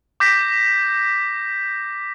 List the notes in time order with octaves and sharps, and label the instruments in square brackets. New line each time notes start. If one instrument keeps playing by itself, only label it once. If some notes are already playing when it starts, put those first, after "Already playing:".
[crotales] D6 G6 A#6 B6